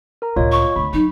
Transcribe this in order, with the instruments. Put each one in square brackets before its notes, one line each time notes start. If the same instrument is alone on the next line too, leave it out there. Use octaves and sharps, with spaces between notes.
[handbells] A#4 A#5
[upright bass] C#2 A2 [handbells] F4 C#5 D#5
[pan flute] C#6
[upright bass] D2 D3 [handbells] B5
[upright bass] F#3 D4 [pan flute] D#4